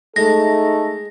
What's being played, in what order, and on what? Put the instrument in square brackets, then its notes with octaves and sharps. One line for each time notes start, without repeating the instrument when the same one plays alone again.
[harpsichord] G#3 [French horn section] A3 D#4 [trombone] A4 [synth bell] A#6